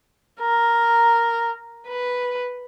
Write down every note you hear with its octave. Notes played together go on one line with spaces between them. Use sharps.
A#4
B4